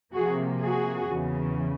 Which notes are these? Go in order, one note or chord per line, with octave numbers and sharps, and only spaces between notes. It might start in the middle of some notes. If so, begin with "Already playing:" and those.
C3 F3 A#3 F#4 G#4
F#4 G#4
E2 C#3 E3